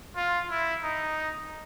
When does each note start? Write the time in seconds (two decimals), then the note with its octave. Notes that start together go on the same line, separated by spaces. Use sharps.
0.16 F4
0.50 E4
0.84 D#4